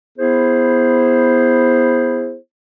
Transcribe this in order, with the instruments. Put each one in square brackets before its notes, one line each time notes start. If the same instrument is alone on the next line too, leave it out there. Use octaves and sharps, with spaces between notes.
[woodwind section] B3 E4 G#4 C5